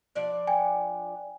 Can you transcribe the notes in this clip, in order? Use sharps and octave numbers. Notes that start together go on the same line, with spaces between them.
F3 D4 D5
G5 G#5